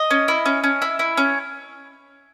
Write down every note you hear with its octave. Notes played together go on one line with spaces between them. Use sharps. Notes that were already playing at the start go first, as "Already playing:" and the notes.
Already playing: D#5
C#4
E4
C#4
C#4
E4
E4
C#4